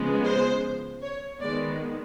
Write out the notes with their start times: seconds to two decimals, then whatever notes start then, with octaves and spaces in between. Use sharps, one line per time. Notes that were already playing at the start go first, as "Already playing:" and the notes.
Already playing: C#3 F3 G#3 B3
0.25 C5
1.02 C#5
1.41 D#3 G#3 B3 D5